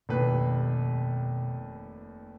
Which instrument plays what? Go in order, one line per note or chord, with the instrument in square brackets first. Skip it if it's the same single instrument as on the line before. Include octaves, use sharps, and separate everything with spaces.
[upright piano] F1 D#2 B4 [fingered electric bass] B2